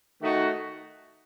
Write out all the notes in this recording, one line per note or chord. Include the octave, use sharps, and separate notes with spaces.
D#3 A3 D#4 F#4